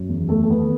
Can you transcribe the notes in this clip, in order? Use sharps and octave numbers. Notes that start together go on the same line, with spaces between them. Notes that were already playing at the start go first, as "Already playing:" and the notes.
Already playing: F#2
E2
E2 A3 A4
A4
D#3 B3 B4